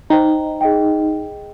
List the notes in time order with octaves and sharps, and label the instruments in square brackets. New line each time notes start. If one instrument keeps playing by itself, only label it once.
[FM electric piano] D#4 [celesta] C5 G5 A#5
[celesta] G#4 D#5 G5